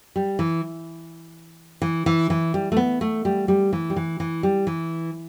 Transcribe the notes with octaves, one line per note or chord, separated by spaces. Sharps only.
G3
E3
E3
E3
E3
G3
A3
B3
A3
G3
G3
E3
G3
E3
E3
G3
E3